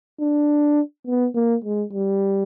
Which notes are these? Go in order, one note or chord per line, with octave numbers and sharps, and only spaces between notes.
D4
B3
A#3
G#3
G3